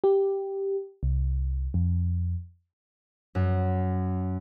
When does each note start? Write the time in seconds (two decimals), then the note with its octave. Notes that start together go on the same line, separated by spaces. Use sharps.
0.04 G4
1.03 C2
1.74 F2
3.35 F#2